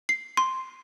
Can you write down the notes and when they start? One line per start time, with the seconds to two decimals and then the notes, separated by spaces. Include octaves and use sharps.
0.09 C7
0.37 C6